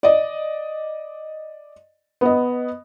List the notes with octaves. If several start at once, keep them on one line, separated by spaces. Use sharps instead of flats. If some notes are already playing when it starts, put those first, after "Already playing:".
D5 D#5
B3 D#5